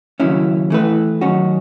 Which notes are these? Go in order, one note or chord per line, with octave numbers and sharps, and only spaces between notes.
D#2 C#3 F#3 C#4 E4
E3 A3 E4 B4
D#3 F#3 C#4 F#4